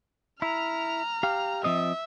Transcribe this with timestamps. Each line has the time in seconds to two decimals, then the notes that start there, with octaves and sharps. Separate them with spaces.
0.42 E4 A#5 F6
1.23 G4 F5
1.64 F3 C4 D#5 E5